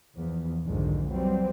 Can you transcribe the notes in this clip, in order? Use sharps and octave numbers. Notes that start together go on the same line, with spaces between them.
E2 F3
B1 F2 G#2 D3 D#3 G#3
E3 F#3 G3 C4